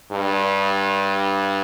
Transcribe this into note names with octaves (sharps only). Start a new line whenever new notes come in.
G2